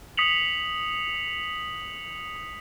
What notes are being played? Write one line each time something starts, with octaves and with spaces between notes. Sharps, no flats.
D#6 B6 C#7 F7 F#7